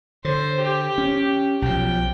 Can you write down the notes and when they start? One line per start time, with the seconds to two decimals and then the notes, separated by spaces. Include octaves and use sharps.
0.25 D3 C5
0.61 G4
0.98 C#4
1.62 B1 B2 F3 G5